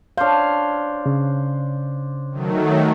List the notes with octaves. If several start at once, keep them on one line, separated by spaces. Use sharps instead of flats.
D4 C5 C#5 F5
C#3
D#3 F#3 A3